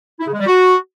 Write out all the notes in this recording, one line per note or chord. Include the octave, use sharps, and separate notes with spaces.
E4
C#3
G#3
G3
F#4